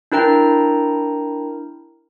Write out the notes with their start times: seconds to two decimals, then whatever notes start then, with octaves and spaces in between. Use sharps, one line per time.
0.12 D4 E4 A#4 G5 A#5